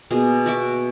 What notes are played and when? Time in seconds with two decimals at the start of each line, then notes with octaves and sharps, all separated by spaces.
0.11 B2 A#3 G#4
0.46 F#4 E5 D6